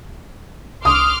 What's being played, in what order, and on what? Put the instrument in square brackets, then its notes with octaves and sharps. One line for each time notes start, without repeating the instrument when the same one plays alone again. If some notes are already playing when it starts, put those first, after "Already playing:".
[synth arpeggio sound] C2 [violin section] C6 D6 F6 [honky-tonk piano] D#6